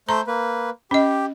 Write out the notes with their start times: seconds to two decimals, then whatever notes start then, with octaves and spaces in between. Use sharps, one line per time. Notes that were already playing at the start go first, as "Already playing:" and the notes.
0.09 A3 C5 A#5 G6
0.27 A#3 B4
0.91 C#4 G4 D#5